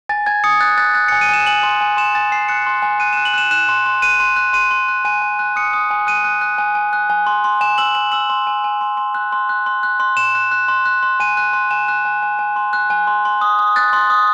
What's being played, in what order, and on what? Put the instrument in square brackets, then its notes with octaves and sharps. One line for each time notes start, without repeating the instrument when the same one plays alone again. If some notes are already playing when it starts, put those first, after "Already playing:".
[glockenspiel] G#5 A6
G#5 G#6
D#6 C#7
F#6 A6
F#6 A6
F#6 A6
C#7
G#5
D#7
G#5 E7
G#5 F#7
C6
G#5
C6 E7
G#5 A6
G#5 C7
F#6 C#7
C6
G#5
F#6 D#7
E7
F#6
F#7
F#6 E7
F#6 E7
C6
C6
F#6 D#7
C6
F#6
C6 D#7
C6
F#6
G#5 D#7
G#5
F#6
D#6 C#7
D#6
G#5
F#6 D#7
F#6
F#6
G#5
G#5
F#6
G#5
C6
C6
G#5 E7
E6 F#7
G#5 F#7
E6 F#7
C6
G#5
G#5
C6
C6
F#6
C6
F#6
C6
F#6
C6
C6 E7
F#6
F#6
C6
F#6
C6
G#5 D#7
F#6
C6
G#5 E7
F#6
G#5
G#5
G#5
C6
F#6
G#5
C6
C6
D#6
D#6
F#6 A6
C6
D#6